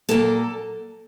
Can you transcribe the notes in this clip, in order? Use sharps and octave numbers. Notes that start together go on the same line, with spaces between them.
A#2 F#3 A#3 A4